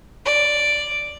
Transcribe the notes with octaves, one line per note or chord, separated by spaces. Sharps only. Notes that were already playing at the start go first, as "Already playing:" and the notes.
D5